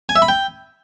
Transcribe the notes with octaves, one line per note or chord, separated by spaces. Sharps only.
G#5
E5
B5
G5